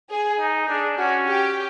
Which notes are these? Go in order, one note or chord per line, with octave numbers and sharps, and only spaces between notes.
G#4
D#4
D4 G#4
C#4 F#4
G4